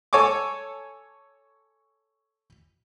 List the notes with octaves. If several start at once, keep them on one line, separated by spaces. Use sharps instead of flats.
A4 C#5 G#5 C#6 D6